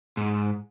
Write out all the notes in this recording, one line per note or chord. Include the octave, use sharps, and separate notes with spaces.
G#2